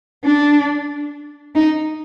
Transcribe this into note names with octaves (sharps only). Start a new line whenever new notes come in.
D4
D#4